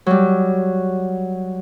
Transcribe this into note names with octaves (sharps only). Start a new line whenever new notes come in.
F#3 G3